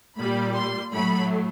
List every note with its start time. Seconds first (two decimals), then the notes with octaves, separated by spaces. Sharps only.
0.17 A#2 G3 A#3 B5
0.56 C6
0.93 A2 F#3 A3 B5